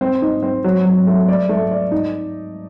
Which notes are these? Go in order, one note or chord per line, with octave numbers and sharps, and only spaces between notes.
C4
D#4
C4
F#3
F#3
A3
D5
A3
D5
D#4